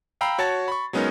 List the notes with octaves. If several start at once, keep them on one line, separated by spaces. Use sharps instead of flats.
F5 G5 A#5 B5 E6 C7
F#4 C#5 A5 A6
B5 C#6
F#3 G#3 B3 C#4 D#4 A#4